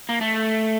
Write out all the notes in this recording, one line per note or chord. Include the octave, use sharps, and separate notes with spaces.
A#3
A3